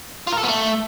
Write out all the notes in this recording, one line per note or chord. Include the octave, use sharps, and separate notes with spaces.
F4
A#4
A4
B3
A3